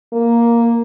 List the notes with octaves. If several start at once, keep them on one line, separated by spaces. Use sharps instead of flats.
A#3